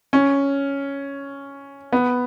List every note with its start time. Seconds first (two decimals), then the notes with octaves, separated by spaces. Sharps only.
0.13 C#4
1.93 B3